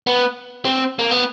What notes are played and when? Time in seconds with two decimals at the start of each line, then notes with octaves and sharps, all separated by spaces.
0.07 B3
0.65 C4
0.99 A#3
1.11 B3